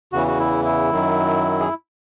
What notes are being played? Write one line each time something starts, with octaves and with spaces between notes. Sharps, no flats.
E2 C#3 E3 F#4
F#4
E4
E4
F#2 D#3 F#3
G#4